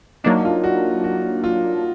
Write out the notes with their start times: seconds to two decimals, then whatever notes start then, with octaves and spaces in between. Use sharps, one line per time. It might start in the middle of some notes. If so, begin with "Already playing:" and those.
0.24 F#3 A#3 D4 D#4
0.45 F4
0.64 F#4
1.04 F#4
1.44 F4